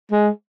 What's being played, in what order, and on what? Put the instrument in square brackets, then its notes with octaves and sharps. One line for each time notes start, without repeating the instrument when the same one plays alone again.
[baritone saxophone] G#3